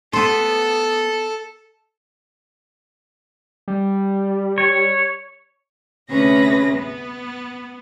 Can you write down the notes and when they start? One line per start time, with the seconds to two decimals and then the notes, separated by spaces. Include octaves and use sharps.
0.13 B3 A4 C5
3.68 G3
4.58 C#5
6.09 D2 C3 C#4 G#4 B4 A#6
6.73 B3